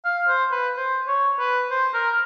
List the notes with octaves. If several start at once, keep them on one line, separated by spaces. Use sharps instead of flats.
F5
C5
B4
C5
C#5
B4
C5
A#4